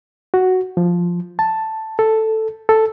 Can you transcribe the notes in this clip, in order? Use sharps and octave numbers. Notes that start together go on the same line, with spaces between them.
F#4
F3
A5
A4
A4